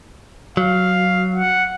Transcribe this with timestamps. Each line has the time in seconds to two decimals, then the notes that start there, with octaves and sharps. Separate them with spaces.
0.57 F#3 F5
1.36 F#5